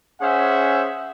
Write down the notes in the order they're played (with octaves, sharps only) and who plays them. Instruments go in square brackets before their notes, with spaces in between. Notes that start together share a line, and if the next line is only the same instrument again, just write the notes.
[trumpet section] C#4 G#4 C5 E5 F#5